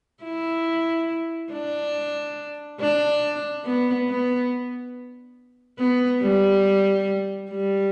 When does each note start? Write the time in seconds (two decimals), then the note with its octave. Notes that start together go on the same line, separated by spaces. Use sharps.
0.24 E4
1.52 D4
2.81 D4
3.65 B3
4.09 B3
5.79 B3
6.22 G3
7.51 G3